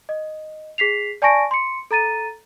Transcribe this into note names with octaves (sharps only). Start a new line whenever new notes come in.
D#5
G#4 B6 C7 F7
D5 G#5 A5 C#6 A#6 D7
C6 C#7
A4 A#5 A6 D#7